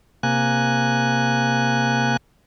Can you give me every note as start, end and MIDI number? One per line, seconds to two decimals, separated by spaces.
0.23 2.17 48
0.23 2.17 58
0.23 2.17 80
0.23 2.17 90